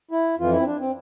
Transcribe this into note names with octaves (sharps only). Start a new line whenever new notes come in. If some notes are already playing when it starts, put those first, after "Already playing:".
E4
F2 E3 F4
E4
C4
D4
C4